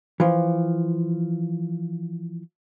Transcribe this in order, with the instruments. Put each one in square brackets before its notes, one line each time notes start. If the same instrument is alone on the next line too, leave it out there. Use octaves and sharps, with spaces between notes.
[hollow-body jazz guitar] E3 F3